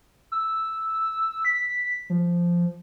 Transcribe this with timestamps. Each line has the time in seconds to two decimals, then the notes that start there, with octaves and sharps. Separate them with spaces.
0.32 E6
1.45 B6
2.10 F3